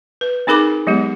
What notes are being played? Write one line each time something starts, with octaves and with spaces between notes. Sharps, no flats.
B4
C4 D#4 G#4 A#4 B5 D6
F#3 G#3 B3 G4